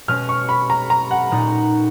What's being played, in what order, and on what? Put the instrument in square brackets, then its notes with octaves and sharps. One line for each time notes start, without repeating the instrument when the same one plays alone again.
[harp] B2 G#3 C#4 [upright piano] F6
[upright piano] C#6
B5
A#5
A#5
F#5
[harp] A#2 G#3 D#4